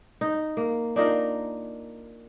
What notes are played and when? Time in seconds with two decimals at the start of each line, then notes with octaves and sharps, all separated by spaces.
0.21 D#4
0.57 A#3
0.96 D4 D#4 F4 A#4